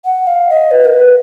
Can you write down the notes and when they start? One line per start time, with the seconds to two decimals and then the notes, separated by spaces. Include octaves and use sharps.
0.05 F#5
0.27 F5
0.50 D#5
0.71 B4
0.85 A#4
0.94 B4